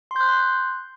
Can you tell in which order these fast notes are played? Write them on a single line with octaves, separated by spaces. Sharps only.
C6 G6 F#6